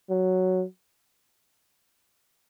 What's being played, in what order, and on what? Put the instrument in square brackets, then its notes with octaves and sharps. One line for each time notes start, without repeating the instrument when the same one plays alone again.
[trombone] F#3